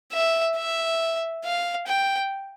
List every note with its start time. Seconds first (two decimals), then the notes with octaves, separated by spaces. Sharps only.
0.13 E5
0.56 E5
1.44 F5
1.87 G5